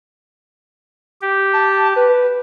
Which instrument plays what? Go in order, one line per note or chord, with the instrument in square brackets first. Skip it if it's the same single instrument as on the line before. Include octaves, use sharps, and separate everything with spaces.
[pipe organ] G4
[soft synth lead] A5
B4